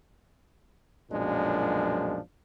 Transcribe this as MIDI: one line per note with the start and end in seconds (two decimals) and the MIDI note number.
1.11 2.18 35
1.11 2.18 42
1.11 2.18 46
1.11 2.18 53
1.11 2.18 56
1.11 2.18 62